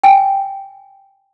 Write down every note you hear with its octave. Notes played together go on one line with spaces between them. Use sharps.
G5 G#5